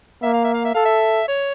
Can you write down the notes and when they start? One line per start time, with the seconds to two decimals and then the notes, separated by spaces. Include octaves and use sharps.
0.23 A#3 E5
0.34 F5
0.44 E5
0.54 F5
0.65 E5
0.75 A4 F5
0.85 E5
1.28 C#5